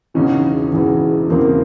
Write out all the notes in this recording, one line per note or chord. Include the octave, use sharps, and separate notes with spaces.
E1 E2 C#3 E3 C#4 D#4
E1 E2 C#3 E3
E1 E2 C#3 E3 A#3 C4